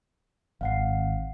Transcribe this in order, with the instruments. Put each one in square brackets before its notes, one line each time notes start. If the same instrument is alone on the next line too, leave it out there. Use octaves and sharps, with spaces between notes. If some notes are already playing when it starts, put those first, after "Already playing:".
[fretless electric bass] G#1 [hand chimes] F5 F#5 C7